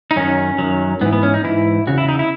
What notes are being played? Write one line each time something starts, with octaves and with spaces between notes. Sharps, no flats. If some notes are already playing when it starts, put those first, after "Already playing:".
D#4
F#2 D#3 F#3 C#4
F#2 D#3 F#3
G#2 E3 B3
B3
C#4
D#4
G#2 E3 E4
E2 C#3 F#4
E4
D#4
E4